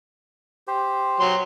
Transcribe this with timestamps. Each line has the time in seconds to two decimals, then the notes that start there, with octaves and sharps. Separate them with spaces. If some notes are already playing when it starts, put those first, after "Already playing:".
0.67 G4 C5
1.20 F#3 C6